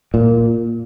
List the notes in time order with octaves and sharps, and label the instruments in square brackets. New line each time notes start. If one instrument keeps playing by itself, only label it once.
[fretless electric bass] A#2